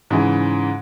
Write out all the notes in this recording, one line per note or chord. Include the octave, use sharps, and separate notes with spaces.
G#2 C#3 E3